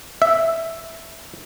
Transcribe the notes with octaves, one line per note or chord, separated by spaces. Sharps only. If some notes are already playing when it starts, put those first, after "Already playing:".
E5